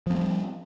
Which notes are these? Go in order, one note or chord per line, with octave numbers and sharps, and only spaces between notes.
F3 G3 A3 C4